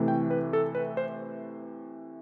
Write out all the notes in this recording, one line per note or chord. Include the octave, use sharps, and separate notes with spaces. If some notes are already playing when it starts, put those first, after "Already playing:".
Already playing: C3 E3 A3
G5
B4
A4
B4
C5